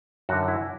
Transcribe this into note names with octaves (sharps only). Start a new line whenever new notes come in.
F#2 D3 F#4
E4